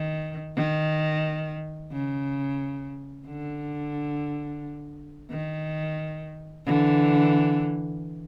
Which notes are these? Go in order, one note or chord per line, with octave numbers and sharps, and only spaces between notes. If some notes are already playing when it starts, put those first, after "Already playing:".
Already playing: D#3
D#3
C#3
D3
D#3
D3 E3